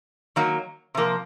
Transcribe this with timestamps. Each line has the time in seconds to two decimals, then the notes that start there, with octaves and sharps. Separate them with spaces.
0.36 D#3 F#3 A#3
0.95 C3 F3 A#3